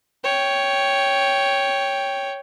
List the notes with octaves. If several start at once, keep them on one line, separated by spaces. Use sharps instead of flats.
C#5 G5